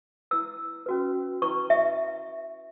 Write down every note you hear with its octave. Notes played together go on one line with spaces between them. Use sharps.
E4 B4 E6
C#4 F#4 B4
E4 B4 C#6
E5